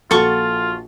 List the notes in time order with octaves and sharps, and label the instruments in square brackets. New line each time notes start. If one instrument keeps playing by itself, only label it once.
[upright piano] A#1 F#4 F#5 [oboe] F4 [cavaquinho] A4 C#6